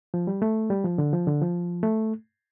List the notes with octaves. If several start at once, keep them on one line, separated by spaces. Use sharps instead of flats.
F3
G3
A3
G3
F3
D3
F3
D3
F3
A3